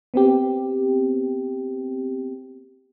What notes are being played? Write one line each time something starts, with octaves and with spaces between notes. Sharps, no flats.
B3 C4 G4